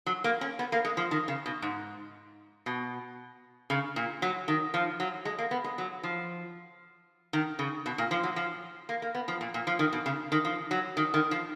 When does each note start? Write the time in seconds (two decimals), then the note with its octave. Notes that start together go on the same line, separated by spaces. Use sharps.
0.06 F#3
0.24 A#3
0.41 C#4
0.59 B3
0.72 A#3
0.85 G#3
0.97 F3
1.11 D#3
1.28 C#3
1.46 B2
1.62 G#2
2.66 B2
3.70 C#3
3.96 A#2
4.22 F#3
4.48 D#3
4.74 F3
5.00 F#3
5.25 G#3
5.39 A#3
5.51 B3
5.64 G#3
5.78 F#3
6.03 F3
7.33 D#3
7.59 C#3
7.86 B2
7.98 A#2
8.11 F3
8.24 F#3
8.36 F3
8.89 A#3
9.02 A#3
9.15 B3
9.28 F3
9.41 A#2
9.54 A#2
9.67 F3
9.79 D#3
9.93 B2
10.06 C#3
10.32 D#3
10.45 F3
10.71 F#3
10.97 D#3
11.14 D#3
11.31 F3